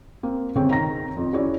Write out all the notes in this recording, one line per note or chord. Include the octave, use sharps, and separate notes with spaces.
A#3 C4
G1 C3 C4 G#4 C#5 G5
D#3 A#5 A#6
F2
C#4 E4 F#4 G#4 C#5 D5